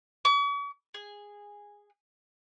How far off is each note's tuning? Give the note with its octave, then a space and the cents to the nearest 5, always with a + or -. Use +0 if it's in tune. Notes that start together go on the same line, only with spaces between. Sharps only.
C#6 +45
G#4 -10